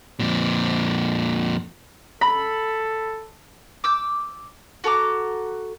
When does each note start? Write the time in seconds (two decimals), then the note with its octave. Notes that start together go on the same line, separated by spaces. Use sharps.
0.19 F2 A#2
2.21 A4 B5
3.84 D6 E6 G6
4.84 F#4 A4 A#5 D6